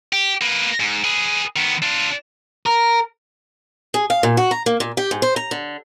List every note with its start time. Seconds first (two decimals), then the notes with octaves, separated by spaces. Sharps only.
0.13 G4
0.41 A#3 B4
0.80 G#2
1.05 G#4 B4
1.56 D#3 B3
1.82 D4 F4
2.66 A#4
3.94 G#4
4.10 F5
4.23 A#2
4.37 F#4
4.51 A#5
4.66 A#3
4.80 A#2
4.97 G4
5.11 G#2
5.22 C5
5.36 A#5
5.51 D3